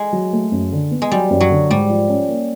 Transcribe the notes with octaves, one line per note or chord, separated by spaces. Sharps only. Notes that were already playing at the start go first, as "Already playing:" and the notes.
Already playing: G#3
F#3
A3
F#2
D3
B3
G#3
F#3 G3
F#2
F#3
D3
G#2 G3
F3
C#4
A#3